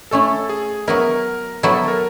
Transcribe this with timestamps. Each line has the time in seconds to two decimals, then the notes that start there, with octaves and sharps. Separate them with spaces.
0.11 A3 C#4 E4 A4
0.49 G#4
0.87 F#3 B3 E4 A#4
1.63 F#3 B3 E4 A4
1.88 A#4